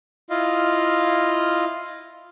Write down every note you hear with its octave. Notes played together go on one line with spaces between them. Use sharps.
E4 F4 D#5 F5